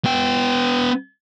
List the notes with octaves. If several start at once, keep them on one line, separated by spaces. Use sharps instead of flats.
B3 G5